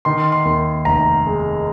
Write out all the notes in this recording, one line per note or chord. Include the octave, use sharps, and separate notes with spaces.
D#3 C6
C6
D#2
F1 A#5
G#3